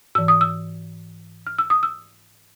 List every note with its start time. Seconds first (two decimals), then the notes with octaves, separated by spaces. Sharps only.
0.15 G#2 E3 E6
0.28 D#6
0.41 E6
1.47 F6
1.59 E6
1.70 D#6
1.83 E6